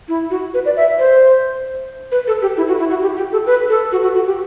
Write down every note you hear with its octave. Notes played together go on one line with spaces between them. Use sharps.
E4
F#4
B4
D5
E5
C5
B4
A4
G4
E4
F#4
E4
F#4
G4
G4
A4
B4
A4
F#4
F#4
F#4
G4